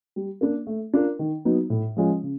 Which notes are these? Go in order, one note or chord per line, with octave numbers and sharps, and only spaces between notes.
G3
A#3 D4
A3
D4 F4 A#4
D#3
F#3 B3 D#4 F#4
A2
F3 G#3 C#4 F4
C#3